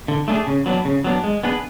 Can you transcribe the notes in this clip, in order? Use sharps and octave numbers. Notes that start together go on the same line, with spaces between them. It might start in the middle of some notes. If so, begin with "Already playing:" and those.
D3
A3 D4 G#4
C#3
F#3 B3 D4
C#3
F#3 B3 D4
G#3
B3 D4 G#4 B4